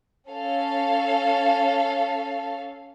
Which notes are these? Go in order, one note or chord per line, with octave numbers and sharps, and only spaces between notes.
C#4 A4 F5